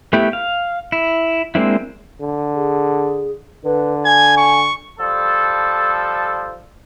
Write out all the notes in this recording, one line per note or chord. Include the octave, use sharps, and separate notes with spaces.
A3 B3 E4 G4
F5
E4
G#3 A#3 C4 D4 E4
D3
G#4
D3 B4
G#5 G#6
C#6
F3 G3 A4